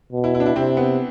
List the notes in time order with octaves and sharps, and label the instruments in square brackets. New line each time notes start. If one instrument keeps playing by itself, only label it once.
[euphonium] B2
[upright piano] E4
E4
D4
E4
[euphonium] C3 [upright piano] C4
[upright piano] B3